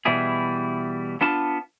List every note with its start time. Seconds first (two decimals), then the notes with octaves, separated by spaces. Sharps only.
0.05 B2 E3 G3 E4 G#4
1.21 B3 D4 F4 A5